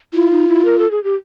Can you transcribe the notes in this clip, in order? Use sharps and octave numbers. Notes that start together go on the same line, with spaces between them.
E4 F4
D#4
E4
A#4
A4
G#4
G4